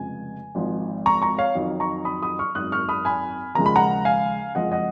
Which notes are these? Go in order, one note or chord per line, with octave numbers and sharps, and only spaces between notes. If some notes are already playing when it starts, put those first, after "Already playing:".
Already playing: F1 F2 C#3 F3 G#3 G#5
G#1 G#2 F3
A#5 C#6
A#5 C#6
C#5 F5
F2 D#3 F#3
A#5 C#6
B5 D#6
B5 D#6
C#6 F6
G#1 F#2 D#3 D#6 F#6
C#6 F6
B5 D#6
G#5 B5
D#2 C#3 F3 G#3 A#5
B5
F#5 A#5
F5 G#5
F#1 F2 F3 G#3 D#5 F#5
D#5 F#5